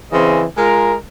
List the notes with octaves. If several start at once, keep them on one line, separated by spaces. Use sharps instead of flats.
C#3 E3 C4 D#5
G#3 F4 A#4